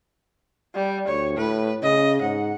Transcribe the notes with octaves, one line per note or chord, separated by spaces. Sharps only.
G3
D2 C#5
A2 B4
C#3 D#5
G#2 F#5